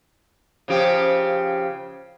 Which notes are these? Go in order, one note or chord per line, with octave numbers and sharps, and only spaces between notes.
C#3 F3 G4